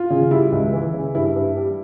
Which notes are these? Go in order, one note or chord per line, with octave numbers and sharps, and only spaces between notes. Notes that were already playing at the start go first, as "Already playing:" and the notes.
Already playing: F4
C#3
G3 E4
C#2
E3
C#3
G2 E4
G2
G3